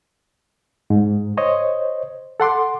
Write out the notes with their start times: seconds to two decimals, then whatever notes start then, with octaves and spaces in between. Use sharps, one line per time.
0.90 G#2
1.37 C5 C#5 D#5
2.40 A4 F#5 C6 D6